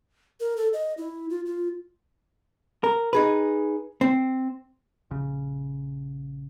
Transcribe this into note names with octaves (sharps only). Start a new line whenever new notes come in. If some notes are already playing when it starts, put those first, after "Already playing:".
A#4
A4
D#5
E4
F4
F4
A#4
D#4 G#4 B4
C4
A#1 C#3